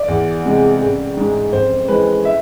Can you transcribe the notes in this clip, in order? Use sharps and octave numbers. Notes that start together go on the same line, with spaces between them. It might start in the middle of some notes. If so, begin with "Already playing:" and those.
Already playing: D5
E2
C3 G#3
A1
G#2 G#3
F2 C5
E3 G#3 B4
E5